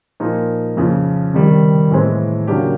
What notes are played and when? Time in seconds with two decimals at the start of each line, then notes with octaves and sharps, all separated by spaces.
0.20 A#2 F3 A#3 D#4
0.77 F2 C#3 F3
1.34 C3 D#3 G3
1.91 A2 E3 G#3 C4
2.47 C#3 F#3 A#3 D4 G4